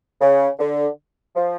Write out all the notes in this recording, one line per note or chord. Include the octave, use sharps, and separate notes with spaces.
C#3
D3
F3